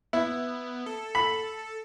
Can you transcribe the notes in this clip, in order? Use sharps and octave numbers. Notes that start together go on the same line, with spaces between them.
B3 E4
A4
B5